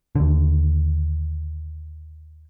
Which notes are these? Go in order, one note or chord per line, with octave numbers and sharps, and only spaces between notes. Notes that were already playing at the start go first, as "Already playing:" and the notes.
D#2 D3